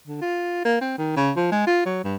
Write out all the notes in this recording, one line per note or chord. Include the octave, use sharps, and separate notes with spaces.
D3
F4
A#3
C4
D#3
C#3
F3
G#3
F4
F#3
G2